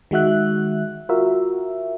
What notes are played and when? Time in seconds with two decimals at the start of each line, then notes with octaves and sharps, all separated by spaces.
0.11 D#3 G#3 F#4 E5 F#6
1.09 F4 F#4 A#4 E5